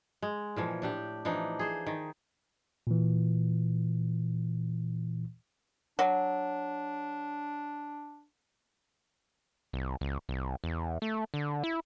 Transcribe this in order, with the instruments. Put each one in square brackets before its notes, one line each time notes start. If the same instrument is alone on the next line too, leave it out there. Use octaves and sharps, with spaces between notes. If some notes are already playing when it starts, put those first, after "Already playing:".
[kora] G#3
A#2 E3 F3
A2 D4 G4
E3 F3 D4 D#4
G#4 C5
D#3
[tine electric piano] A#2 E3
[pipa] F#3 [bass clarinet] D4
[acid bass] C2
C#2
C2
E2
A3
D3
E4